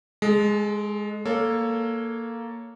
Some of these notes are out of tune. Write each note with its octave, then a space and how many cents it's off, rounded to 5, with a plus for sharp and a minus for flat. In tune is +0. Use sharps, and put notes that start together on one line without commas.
G#3 +0 A4 -30
A#3 +0 A4 +10 C#5 +5